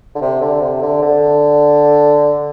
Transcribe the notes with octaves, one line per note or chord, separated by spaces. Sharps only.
D3
C3
D3
C3
D3
D3